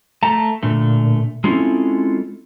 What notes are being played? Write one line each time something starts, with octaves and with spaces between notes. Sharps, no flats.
A3 A5 A#5
A#2 D3 A3
G#3 C4 C#4 E4 F4 A4